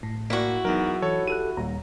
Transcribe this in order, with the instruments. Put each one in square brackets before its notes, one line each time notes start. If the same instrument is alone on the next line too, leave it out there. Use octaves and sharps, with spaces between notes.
[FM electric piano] A2
[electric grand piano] A#3 [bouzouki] E4 F#4
[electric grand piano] E2 A#4 [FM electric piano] F#3 D#4
[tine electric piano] E3 [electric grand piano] A4 C#5
[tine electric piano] G4 A4 F#6 [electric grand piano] D#7
[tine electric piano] D#2 A#2 G3 [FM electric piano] A#5